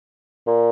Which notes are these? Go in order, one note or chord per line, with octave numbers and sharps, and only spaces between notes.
A#2